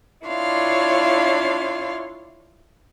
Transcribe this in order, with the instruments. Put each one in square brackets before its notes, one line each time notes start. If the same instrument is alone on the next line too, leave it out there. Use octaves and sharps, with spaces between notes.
[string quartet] D4 E4 F4 C#5 F5 C6